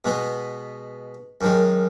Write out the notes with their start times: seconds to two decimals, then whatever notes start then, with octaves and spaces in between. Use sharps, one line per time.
0.05 B2 G#3 B3
1.41 F#2 D#3 G#3